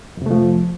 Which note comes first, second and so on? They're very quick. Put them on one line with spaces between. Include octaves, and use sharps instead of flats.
F2 C3 A3 F3